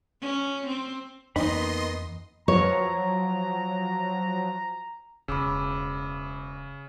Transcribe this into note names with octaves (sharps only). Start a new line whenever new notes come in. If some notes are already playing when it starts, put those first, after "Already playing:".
C#4
C4
F2 E3 A#3 B3 D#4 D#5 B5 C6
F3 F#3 C#5 A#5
E1 C#3 B5 D6 E6